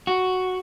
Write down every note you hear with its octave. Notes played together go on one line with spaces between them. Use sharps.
F#4